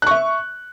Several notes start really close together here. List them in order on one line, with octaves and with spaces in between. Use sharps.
F#6 C#6 E5